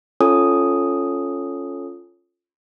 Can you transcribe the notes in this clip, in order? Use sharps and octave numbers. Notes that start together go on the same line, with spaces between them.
C#4 F4 A4 C#5 G#5 D#6